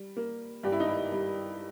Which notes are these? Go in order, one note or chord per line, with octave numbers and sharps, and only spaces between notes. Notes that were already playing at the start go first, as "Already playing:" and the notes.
Already playing: G3
A#3
G2 G4
E4
D#4
E4
G3